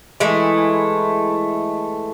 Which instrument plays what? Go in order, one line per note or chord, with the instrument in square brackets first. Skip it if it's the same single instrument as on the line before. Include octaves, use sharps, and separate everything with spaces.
[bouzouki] E3 G#3 A3 E4